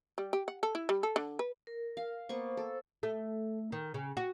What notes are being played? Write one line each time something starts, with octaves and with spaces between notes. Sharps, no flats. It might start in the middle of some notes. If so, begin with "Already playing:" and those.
G3
G4
F#5
A4
E4
G3
A4
D3
B4
A#4
F5
A#3 B3 C5 C#6
A4
A3
D#3
C#3
F#4